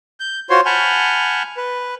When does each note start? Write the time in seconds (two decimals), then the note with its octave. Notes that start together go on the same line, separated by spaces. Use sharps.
0.20 G6
0.50 F4 F#4 C5 C#5 C6
0.66 F#5 G#5 A5 B5 F6 G6
1.57 B4